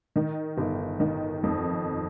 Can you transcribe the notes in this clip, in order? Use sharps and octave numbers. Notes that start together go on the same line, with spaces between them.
D#3
G1
D#3
F2